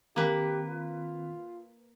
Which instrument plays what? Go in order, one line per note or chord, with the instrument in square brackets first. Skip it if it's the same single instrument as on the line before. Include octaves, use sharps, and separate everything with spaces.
[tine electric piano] D#3 C4 [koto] A#3 B4 [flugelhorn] G4
[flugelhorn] F4